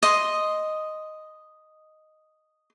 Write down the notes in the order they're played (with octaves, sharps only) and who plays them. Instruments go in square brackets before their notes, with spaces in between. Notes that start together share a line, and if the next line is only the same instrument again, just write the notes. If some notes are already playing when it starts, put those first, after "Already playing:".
[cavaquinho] D#5 C6